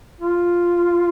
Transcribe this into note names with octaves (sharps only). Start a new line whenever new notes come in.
F4